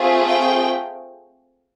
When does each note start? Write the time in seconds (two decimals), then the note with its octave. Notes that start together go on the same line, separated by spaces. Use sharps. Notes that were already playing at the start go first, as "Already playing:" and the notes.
Already playing: A3 C4 F4 G#4
0.26 G5